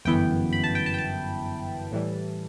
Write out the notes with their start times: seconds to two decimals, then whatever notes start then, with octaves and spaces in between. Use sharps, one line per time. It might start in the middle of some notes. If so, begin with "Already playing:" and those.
0.05 G1 F#2 E3 B3 E4 G5
0.53 B5
0.64 A5
0.75 G5
0.86 A5
0.94 G5
0.99 A5
1.92 A2 E3 G3